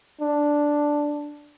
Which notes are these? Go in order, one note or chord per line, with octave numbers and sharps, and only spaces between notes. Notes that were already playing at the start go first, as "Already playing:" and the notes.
D4